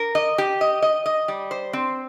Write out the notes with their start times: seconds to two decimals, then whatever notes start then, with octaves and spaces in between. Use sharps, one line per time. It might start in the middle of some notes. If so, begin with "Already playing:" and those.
Already playing: A#4
0.15 D#5
0.38 G4
0.61 D#5
0.82 D#5
1.06 D#5
1.28 G3
1.51 C5
1.73 C4